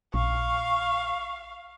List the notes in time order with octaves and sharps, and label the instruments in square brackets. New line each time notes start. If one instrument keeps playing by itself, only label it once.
[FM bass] A#1 [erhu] F5 [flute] C#6